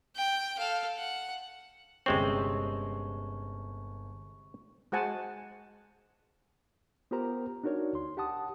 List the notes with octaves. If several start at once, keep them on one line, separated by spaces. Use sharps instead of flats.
G5
A4 F5
F#5
G1 C3 G#3 C4 C#4 C#6
G#3 F#4 C5 F#5 G#5 A5
B3 F4 G4 A#4 C5 A#5
D4 D#4 F#4 A#4 C#5 D5
D2 C6
G4 F#5 A5 D#6